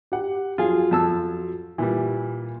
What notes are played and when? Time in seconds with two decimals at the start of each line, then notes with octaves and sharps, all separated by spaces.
0.12 G4 F#5
0.58 F3 F#3 F4 G#4
0.91 F2 A5 E6
1.78 A#2 E3 G3